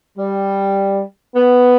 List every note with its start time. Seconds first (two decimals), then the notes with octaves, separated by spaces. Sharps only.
0.16 G3
1.36 B3